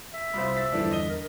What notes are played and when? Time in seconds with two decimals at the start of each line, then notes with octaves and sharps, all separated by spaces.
0.14 E5
0.33 C2 F4 C5 B5 E6
0.57 E6 A6 B6
0.72 E2 G2 D3 E3 F3 D4
0.92 D#5 D#7 G7
1.10 A#4